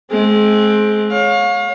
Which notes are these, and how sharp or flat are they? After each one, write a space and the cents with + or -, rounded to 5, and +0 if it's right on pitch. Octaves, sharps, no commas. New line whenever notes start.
G#3 +30 C4 +10
C#5 -5 F5 +35